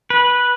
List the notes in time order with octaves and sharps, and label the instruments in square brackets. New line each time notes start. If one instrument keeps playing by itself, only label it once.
[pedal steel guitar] B4